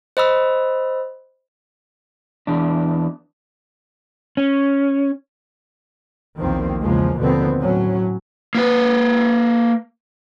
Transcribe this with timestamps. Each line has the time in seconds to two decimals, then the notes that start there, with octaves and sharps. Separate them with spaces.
0.17 C5 D#5 B5 E6
2.47 E2 D4
4.37 C#4
6.38 B1 E2 D#3 F3 A#3 C4
6.80 E2 C#3 F3 G#3 A#3
7.18 D#2 B2 D3 F3 B3 C4
7.58 A2 F#3 C#4
8.55 A#3 B4